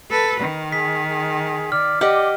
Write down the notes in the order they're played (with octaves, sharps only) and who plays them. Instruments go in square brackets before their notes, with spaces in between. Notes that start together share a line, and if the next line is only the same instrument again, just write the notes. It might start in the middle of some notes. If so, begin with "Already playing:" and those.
[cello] A4 B4
D#3
[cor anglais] G#4 [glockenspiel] B6
[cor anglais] G#4
[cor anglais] D5 [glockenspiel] F6
[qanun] G4 D#5 F#5 [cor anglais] D5